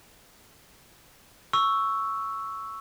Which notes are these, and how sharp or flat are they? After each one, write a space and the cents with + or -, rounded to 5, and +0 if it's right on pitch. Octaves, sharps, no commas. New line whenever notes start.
C#6 +0 E6 +0